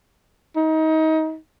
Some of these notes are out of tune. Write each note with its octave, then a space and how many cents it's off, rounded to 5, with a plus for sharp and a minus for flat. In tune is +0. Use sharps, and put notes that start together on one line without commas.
D#4 +25